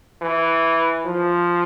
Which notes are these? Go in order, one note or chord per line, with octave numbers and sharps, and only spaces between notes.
E3
F3